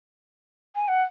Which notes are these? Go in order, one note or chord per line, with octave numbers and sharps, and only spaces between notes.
G#5
F#5